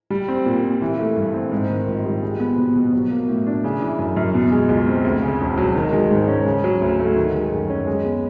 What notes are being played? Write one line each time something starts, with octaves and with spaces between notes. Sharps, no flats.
G3
C4
A#2
A#2
E3
A3
G2
C4
G#2
D#3
A#1
G3
G#3
B3
B2
B2
F#3
A#3
A2
D4
C#3
E3
F#2
F#2
B2
G#3
C#2
C4
D2
C#3
E1
F#3
D#3
G#3
G#2
C#4
C#3
F#3
D2
A3
D#3
G#3
F#2
C#4
G#3
B3